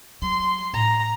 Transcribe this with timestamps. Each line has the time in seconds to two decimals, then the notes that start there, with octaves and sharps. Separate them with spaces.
0.22 F#3 C6
0.73 A2 A#5